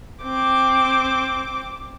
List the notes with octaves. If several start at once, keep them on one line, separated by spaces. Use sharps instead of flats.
C4 D6